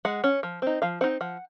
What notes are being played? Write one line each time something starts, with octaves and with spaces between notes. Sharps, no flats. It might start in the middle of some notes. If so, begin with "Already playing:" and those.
G#3 F#5
C#4
F3
C4 D#4
F3 F5
C4 D#4 F#5
F3 F#5